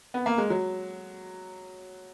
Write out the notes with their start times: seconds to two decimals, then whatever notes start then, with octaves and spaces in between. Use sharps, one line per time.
0.14 B3
0.26 A#3
0.38 G#3
0.50 F#3